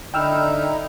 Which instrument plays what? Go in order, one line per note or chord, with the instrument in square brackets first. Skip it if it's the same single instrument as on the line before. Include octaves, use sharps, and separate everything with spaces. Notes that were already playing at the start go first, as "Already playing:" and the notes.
[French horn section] D3 D5 [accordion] D#4 E4 [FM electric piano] G5 E6 F6